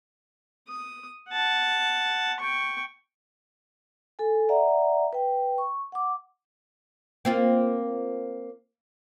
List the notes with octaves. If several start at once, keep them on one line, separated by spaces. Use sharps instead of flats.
D#6
F#5 A5
G5 C#6
A4 G#5
D5 E5 F#5 A#5
B4 G5
C#6
F#5 D6
A#3 C4 F4